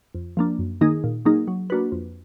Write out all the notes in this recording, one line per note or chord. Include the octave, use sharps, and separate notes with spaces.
F2
F3 A#3 D4
F#2
D#3 A#3 D#4 G#4
A#2
F#3 A#3 D#4 G#4
F#3
A#3 D4 F#4 B4
F2